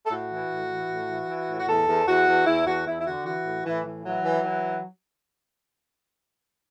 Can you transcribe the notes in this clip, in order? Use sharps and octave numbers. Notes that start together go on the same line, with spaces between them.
A4
A2 F#4
E3
A2
E3
A2
E3
E3
A2
F#4
E2 A4
E2
E2 F#4
E2
E2 E4
E2 F#4
E2 E4
E4
D3 F#4
E3 F#4
A2
A2 E3
E3
E3 F#3
E3
E3